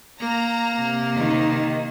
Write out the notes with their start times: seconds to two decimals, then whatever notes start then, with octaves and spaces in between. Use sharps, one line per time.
0.20 A#3 A#5
0.77 C3
1.18 D#3